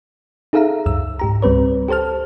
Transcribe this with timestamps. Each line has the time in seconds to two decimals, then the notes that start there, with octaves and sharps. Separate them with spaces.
0.53 D#4 G#4 A4 E5 F5 A#5
0.86 C#2 F#2 E6
1.19 G#2 G4 A#5
1.42 C#2 G3 C4 B4 C#5
1.88 G4 A4 C5 A5 F6